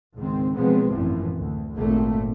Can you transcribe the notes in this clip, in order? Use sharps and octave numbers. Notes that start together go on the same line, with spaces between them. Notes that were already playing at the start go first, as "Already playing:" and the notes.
C#2 G#2 D#3 C4
B2 F3 F#3 G#3 B3 C4
G#1 F#2 A2 E3 F3
D2
G#1 A#2 A3 A#3 C4